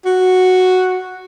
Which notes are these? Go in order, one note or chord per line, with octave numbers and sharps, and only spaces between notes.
F#4